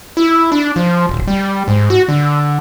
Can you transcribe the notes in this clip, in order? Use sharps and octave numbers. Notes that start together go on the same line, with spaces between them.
E4
D4
F3
D1
G3
G#2
F#4
D3